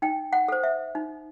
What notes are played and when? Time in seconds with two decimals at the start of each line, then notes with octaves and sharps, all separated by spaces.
0.02 D#4 G5
0.33 F#5
0.48 A4 C5
0.63 E5
0.95 D#4